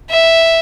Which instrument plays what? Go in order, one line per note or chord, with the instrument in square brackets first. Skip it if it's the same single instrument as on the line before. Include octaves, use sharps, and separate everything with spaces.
[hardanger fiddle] E5